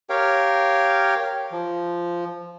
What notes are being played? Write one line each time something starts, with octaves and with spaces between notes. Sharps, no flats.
G4 A#4 C#5 F5 G5
F3